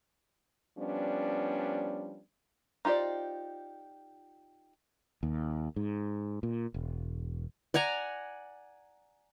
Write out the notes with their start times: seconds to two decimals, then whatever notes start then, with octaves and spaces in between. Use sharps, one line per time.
0.78 F3 G3 B3 C#4 D4
2.85 D#4 F4 G4 C5 D5
5.23 D#2
5.76 G#2
6.43 A#2
6.74 E1
7.74 D5 F#5 G#5 A#5